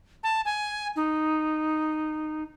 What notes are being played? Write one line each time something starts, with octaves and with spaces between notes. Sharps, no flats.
A5
G#5
D#4